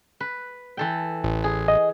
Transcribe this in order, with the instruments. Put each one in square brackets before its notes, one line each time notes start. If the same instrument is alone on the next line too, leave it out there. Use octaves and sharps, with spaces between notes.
[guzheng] B4
E3 A4 G5
[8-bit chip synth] A1
[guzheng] G#4
[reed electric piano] D#5